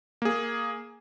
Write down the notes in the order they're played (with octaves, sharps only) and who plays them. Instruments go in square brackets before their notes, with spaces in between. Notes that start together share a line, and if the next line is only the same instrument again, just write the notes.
[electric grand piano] A#3 G#4